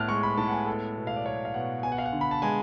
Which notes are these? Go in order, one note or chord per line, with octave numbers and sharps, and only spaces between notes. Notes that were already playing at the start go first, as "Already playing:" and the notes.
Already playing: A2 B3 F#5 A5 F6 F#6
G#3 C#6
B5
A2 A5
F#5
G#5
B3 A4
B2
F5
D5
F#3 C#5
F5
B2 F#5
B3 G#5
F#5
F5
F#5
D3
B5
A5
G#3 G#5